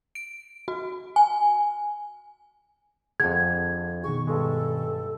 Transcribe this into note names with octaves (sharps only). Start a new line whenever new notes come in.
D7
F#4
G#5
F2 D3 G#4 F#5 G#6
B2 D#3 G#4 C#6
G2 G#3 A4